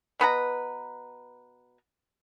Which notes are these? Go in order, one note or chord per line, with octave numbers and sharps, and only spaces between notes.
B2 B3 B4 A#5